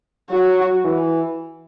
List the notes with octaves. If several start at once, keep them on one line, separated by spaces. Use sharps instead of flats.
F#3 F#4
E3